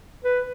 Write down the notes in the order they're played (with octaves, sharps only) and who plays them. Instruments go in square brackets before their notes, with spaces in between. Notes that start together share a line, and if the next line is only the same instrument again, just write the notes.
[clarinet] B4